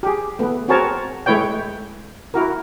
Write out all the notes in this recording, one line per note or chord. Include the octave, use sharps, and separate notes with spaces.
G4 G#4
A3 B3
C4 F#4 G#4 A#4 C#5 A5
G#3 A3 E4 B4 C#5 G5
E4 F#4 A#4